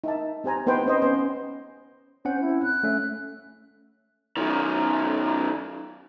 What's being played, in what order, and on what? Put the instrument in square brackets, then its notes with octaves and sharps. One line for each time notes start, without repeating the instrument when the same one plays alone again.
[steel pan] D#4 E5 A5
C4 G4 C5 G#5 A#5
B3 C4 D#4 B4 C5 G5
C#4 C5 D#5
B3 C#4 C5 C#5
[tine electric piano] C4 C#4 F#5 [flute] C5
[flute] E4
F#6
[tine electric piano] A3 C#4 E5
[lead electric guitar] F#2 D#3